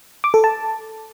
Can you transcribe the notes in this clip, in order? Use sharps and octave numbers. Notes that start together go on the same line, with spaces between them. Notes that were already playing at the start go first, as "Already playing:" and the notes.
D6
A4
A5